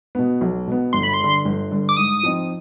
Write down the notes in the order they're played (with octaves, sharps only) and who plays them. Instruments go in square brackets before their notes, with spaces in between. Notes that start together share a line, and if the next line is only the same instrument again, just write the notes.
[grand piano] B2 B3
B1
B2 B3
[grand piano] G1 [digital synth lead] C6
[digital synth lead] B5
C6
[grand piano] G2 D3
G1
G2 D3
[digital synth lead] D6
[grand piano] G#2 [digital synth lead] D#6
[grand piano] F3 C4 D#4